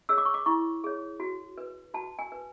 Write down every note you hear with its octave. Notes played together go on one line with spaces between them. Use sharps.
G#4 C#5 E6
D6
C#6
D6
E4 C#6
G#4 C#5
F#4
B4
F#4 A5
G#5
B4